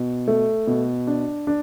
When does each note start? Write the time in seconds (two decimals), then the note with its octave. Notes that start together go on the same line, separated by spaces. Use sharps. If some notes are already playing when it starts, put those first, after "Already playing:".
Already playing: B2
0.27 A3
0.67 B2
1.07 D4
1.47 D4